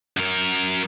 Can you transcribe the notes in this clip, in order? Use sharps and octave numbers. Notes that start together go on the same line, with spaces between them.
F#2 A#4